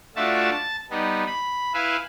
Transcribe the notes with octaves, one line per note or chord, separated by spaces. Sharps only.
A3 D4 F4 F#4 E5 A5
A5
G3 B3 D#4
B5
E4 B4 E5 F5 G#5